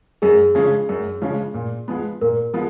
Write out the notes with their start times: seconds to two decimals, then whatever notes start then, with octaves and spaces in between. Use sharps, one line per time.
0.22 F#2 G#4
0.55 C#3 F3 G#3 C#4
0.89 F#2
1.22 C#3 F3 G#3 C#4
1.54 A#2
1.88 F3 G#3 B3
2.21 A#2 A#4
2.54 F3 G#3 B3